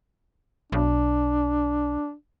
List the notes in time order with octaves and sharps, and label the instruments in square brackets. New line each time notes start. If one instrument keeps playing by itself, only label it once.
[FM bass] B1 [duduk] D4